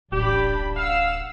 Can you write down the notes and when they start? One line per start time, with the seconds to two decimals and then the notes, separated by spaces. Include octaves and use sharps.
0.12 D1 A1 D4 G4 B5
0.77 F5 F#5 E6